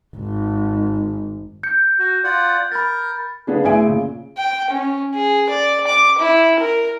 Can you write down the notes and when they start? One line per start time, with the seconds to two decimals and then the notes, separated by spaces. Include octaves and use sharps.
0.16 G#1
1.63 G6 C#7
1.99 F#4
2.24 F4 D5 F#5
2.72 A#4 B5 A6
3.47 C#3 B3 D4 G#4
3.64 A1 G#4 E5 G#5 D7
3.85 A#2 C#3
4.37 G5
4.70 C#4
5.14 G#4
5.49 D5
5.87 D6
6.18 E4
6.60 A#4